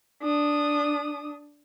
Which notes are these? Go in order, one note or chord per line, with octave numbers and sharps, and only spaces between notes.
D4 D#6